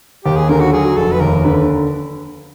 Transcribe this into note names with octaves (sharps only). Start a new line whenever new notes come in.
D#2 G4
G#4
D3 A#4
F#4
F#3 G#4
F1 A4
B4
D#2 A#4
D3 B4